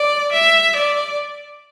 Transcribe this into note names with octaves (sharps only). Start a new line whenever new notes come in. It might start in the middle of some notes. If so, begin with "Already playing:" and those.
Already playing: D5
E5
D5